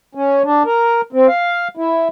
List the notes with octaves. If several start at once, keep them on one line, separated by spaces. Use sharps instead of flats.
C#4
D4
A#4
C4
F5
E4